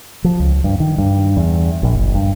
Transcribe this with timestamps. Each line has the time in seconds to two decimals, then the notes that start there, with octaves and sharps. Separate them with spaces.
0.24 F3
0.39 C#2
0.64 G2
0.80 D#3
0.98 G2
1.37 E2
1.83 A#1
1.95 F#1
2.15 G2